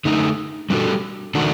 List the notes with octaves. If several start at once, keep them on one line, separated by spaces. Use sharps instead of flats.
D3 A3 D#4
G3 D4 F#4 A4
D#3 A3 D4 F#4